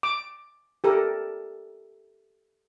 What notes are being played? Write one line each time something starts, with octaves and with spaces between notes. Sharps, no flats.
D6
G4 A4 A#4